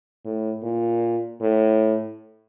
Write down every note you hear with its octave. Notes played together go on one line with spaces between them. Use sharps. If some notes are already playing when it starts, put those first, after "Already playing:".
A2
A#2
A2